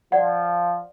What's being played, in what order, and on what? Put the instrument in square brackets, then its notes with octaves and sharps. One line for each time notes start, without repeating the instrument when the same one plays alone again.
[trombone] F3 [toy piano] D5 F#5